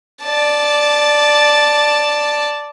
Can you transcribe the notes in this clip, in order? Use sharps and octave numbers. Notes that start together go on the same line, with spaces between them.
D5 A5